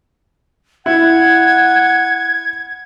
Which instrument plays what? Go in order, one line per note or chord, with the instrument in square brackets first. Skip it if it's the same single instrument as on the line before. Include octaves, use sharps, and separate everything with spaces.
[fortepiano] E4 [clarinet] F#5 [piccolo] G#6